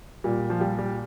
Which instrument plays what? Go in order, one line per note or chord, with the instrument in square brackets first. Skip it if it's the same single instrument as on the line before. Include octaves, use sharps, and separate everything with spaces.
[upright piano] A#2 [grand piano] G3
[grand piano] F3
[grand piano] G3 [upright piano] G4
[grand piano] G3